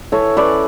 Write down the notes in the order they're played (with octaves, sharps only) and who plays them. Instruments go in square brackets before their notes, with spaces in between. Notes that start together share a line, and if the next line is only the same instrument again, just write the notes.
[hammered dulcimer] E3 A4 C#5
C#4 B4 D5